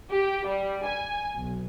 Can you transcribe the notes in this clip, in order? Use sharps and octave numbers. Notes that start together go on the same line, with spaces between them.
G4
G3
G#5
B1